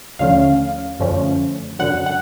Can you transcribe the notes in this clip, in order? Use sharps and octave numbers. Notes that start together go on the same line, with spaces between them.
D#2 D3 F3 A3 C#4 F5
F#2 D3 F3 A3 C#4
F#2 D3 F#3 F#5
F#5